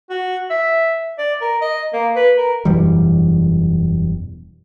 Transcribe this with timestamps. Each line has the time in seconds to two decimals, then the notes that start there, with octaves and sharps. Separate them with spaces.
0.10 F#4
0.50 E5
1.18 D5
1.41 A#4
1.62 D#5
1.93 A#3
2.16 B4
2.37 A#4
2.65 E1 F#2 E3 G3